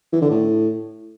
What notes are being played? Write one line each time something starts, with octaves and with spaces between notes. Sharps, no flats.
E3
D3
A2